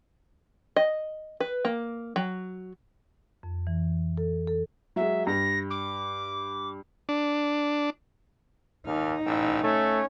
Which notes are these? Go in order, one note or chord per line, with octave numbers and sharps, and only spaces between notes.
D#5
B4
A#3
F#3
F2
E3
A4
A4
F#3 G#3 E5
G2 A#6
D6
D4
D#2 D#4 F6
A1 G5 E6
A3 C#4 C#5